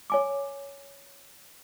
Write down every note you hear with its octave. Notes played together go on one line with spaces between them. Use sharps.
C#5 G#5 D6